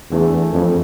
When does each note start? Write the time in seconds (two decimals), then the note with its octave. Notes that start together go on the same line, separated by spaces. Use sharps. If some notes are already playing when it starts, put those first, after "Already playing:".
0.11 E2 E3 A3 D4 A4
0.53 F2